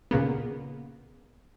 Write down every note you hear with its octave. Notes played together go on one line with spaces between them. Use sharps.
A#2 C#3 A#3 B3